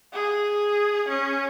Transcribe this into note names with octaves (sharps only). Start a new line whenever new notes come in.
G#4
C#4